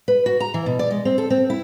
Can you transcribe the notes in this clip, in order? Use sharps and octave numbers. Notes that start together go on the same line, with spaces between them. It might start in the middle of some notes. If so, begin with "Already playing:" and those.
B4
F#4
A#5
E3
B2
D5
G#3
C4
A4
C4
E4